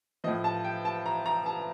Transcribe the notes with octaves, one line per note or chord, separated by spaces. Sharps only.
A2 F3 D#5
A5
G5
A5
A#5
A#5
A5